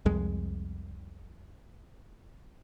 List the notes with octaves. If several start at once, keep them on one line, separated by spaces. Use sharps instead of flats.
C2 F2 G#3